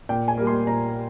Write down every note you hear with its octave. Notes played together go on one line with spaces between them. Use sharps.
A#2 G5
G#5
G3 A#3
C6
A#2 A#5